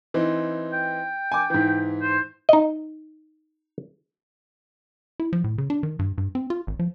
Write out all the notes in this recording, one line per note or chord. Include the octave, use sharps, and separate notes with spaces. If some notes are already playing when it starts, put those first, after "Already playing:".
E3 C4 D#4
G5
G#5 D6
G#2 E3
C5
D#4 D#5
E4
F3
A2
C#3
D4
D#3
G2
G2
C4
F4
G#1
F3